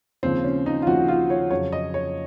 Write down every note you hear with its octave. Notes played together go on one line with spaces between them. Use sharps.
D#2 C#3 F3 C4
C#4
D#4
F4
D#2 C#3 F3 F#4
F4
C#5
F2 C#3 F#3 C#5
D#5
C#5